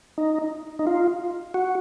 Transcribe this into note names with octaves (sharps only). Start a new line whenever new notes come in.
D#4
D#4
F4
F#4